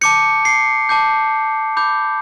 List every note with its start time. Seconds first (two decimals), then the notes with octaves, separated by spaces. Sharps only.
0.01 A5 D6 G6 C#7
0.45 C7
0.89 A5 D6 G6
1.77 B5 D6 G6